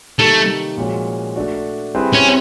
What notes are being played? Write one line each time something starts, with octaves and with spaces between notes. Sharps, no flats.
C3 D#3 G3 A3 A#3 D#4
A#2 F3 G#3 C#4 F#4
A3 D4 F#4
G3 C4 E4 G#4 B4
C#4